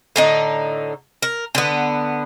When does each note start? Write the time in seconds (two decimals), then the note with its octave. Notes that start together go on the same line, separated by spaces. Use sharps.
0.16 A2 D3 D#4
1.22 A#4
1.55 D3 B3